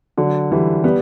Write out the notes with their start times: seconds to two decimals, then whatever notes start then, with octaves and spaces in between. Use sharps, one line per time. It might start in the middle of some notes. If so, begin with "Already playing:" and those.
0.17 D3 F#3
0.52 E3 G3
0.84 G3 B3